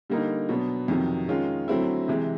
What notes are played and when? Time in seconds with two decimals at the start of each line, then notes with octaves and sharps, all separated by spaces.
0.10 D3 G3 A#3 D#4
0.49 B2 F#3 B3 D4
0.88 F2 C3 D#3 F#3
1.28 D#3 G#3 C#4 F4
1.68 D3 F#3 A3 C4 E4
2.08 C3 E3 G#3